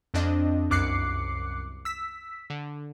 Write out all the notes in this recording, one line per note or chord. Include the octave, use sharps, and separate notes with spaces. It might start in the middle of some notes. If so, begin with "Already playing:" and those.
F2 C4 D4 D#5
C2 F#2 D6 F#6 C7 C#7
E6 B6
D3